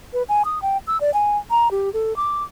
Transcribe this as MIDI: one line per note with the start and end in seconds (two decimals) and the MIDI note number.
0.13 0.23 71
0.29 0.43 80
0.45 0.61 87
0.62 0.77 79
0.87 1.00 88
1.01 1.13 74
1.14 1.37 80
1.50 1.70 82
1.71 1.91 67
1.93 2.16 69
2.16 2.43 86